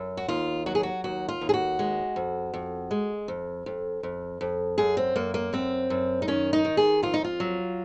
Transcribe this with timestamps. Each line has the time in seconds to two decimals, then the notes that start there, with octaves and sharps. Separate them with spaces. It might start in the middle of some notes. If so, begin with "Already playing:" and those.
Already playing: F#2
0.17 F#4
0.28 D#2 F4
0.66 F#3 F#4
0.75 G#4
0.83 F#4
1.04 D#2 F#4
1.29 F4
1.41 D#2
1.49 G#4
1.54 F#4
1.79 G#3
2.16 F2
2.54 F2
2.91 G#3
3.28 F2
3.66 F2
4.03 F2
4.41 F2
4.78 F#2 G#4
4.97 C4
5.16 F#2 A#3
5.34 A#3
5.53 F#2 C4
5.90 F#2
6.22 D#4
6.28 D#3 C#4
6.53 D#4
6.65 D#3
6.77 G#4
7.03 F2 F4
7.14 D#4
7.24 F4
7.40 F#3